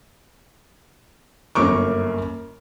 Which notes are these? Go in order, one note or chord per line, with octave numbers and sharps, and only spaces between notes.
G1 F#2 A#3 A#4 C#6 D6